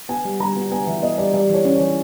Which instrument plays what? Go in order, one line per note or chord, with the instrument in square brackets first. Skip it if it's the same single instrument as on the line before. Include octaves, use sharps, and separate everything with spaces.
[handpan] B3 [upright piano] G#5
[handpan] G3
[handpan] G3 [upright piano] A#5
[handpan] B3
[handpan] B3 [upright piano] G#5
[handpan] E3 [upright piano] E5
[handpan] B3 [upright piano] D#5
[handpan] G3 [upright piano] D5
[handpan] G3 [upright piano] D5
[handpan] E3 [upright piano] C#5
[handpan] C#4
[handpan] E3 [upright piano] C#5